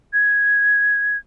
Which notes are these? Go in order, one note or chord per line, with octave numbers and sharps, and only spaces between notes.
G#6